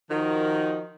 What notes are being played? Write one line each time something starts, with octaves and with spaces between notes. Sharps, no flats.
D#3 F3 D#4 F#4 A#4